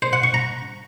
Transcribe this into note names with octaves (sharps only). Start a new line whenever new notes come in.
C5
F#5
C#6
A#5